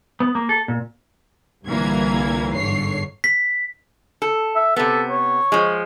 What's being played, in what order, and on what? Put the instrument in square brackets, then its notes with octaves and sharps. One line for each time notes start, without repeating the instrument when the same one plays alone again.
[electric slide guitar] B3
A#3
A4
A#2
[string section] C2 A#2 D3 E3 A#3 G#6
G1 G#2 D3 C#5 C7
[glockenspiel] B6
[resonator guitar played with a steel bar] A4
[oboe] E5
[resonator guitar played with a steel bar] C3 B3 [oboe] A4
[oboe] C#5
[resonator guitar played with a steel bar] F3 G#3